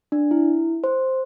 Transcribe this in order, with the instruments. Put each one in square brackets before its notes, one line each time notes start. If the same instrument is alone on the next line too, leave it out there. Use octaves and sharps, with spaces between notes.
[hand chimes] D4
E4
C5